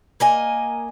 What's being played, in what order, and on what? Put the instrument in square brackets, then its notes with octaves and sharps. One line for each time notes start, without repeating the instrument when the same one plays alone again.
[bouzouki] A#3 D#5 G#5